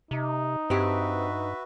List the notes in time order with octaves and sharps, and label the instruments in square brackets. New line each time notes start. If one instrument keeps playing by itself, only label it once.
[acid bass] C3 [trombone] D#4
[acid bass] G2 [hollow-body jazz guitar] C4 G4 [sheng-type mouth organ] F#4 B4 E5